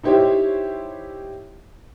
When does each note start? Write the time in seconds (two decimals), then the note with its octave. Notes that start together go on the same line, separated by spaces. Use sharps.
0.03 D#4 E4 G4 C5 C#5 E5